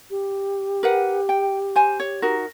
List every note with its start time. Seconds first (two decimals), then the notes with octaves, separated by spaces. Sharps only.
0.10 G4
0.83 A#4 B4 F#5
1.29 G5
1.76 C5 G#5
2.00 C#5
2.22 D#4 F#4 A#4